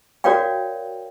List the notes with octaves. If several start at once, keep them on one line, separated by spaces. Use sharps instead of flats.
F#4 A#4 C#5 D5 F5 G5